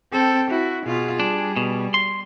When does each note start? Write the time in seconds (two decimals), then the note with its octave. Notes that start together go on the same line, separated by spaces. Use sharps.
0.13 C4 A4 G5
0.51 E4 F#4
0.86 B2 F4 G#4
1.20 G3 D4
1.57 B2
1.94 C6